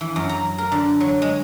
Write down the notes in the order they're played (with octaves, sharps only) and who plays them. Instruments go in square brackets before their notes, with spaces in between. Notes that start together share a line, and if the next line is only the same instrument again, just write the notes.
[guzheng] E3
F#2
A#5
A#4
D3
F#3
G#3